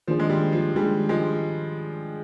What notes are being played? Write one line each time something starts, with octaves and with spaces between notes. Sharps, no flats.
D#3 F3 A#3 D4 G#4 C5
G#3
G3
F3
D#3 G3 G#3 D4 G#4
F3 G#3